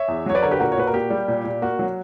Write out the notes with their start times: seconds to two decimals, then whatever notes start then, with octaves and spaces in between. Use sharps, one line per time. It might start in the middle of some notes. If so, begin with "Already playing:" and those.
Already playing: C#5 E5
0.08 E2
0.26 F#3 C#5
0.35 B4 D5
0.43 D3 A#4 C#5
0.51 G4 B4
0.60 A#2 F#4 A#4
0.72 C#5
0.77 A#2 B4
0.87 A#4
0.93 A#3 G4
1.10 G3
1.28 A#2
1.44 A#2
1.62 A#3 F#4
1.79 F#3